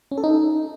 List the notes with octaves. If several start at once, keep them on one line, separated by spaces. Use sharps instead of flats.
C#4
A4
D#4